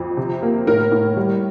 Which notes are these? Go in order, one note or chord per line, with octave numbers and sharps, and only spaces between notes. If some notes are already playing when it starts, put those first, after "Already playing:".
Already playing: F2
C3
A#3
A2 A#4
A2
G3